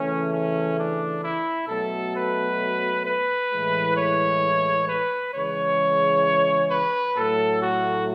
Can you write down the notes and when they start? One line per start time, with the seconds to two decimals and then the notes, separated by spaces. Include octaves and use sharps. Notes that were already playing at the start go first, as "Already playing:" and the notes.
Already playing: C#3 E3 A3 C#4
0.32 C#4
0.78 D4
1.24 E4
1.68 B2 F#3 A3 A4
2.15 B4
3.06 B4
3.51 A2 E3 G#3
3.97 C#5
4.89 B4
5.34 C#3 E3 G#3 C#5
6.71 B4
7.17 A2 F#3 A3 A4
7.63 F#4